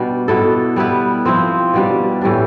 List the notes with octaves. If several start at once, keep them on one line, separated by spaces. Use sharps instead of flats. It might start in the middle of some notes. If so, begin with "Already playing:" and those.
Already playing: B2 G3 D4
B2 B3 E4 A4
G3 B3 E4 B4
F3 C4 E4
B2 G3 D4
A2 E3 G3 D4